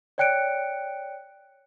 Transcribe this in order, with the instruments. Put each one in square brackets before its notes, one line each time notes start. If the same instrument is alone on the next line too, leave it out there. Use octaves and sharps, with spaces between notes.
[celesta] C#5 D5 G5 F#6 C#7 D7